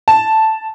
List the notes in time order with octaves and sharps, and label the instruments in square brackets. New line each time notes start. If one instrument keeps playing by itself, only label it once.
[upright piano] A5